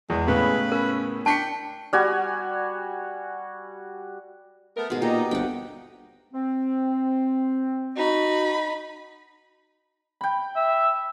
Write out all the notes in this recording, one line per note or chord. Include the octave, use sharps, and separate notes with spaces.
E2 G#3
A2 C#3 B3 B4 B5
C#4 A#4
D4 G5 A5 C#6 B6 C#7
G3 F#4 G#5
A3 B3 A#4
G#2 B2 G#3 G#4
A#2 D#4 G4
G1 D#2 C3 A3 F#5 G5
C4
D#4 F#4 B5
G5 B5
E5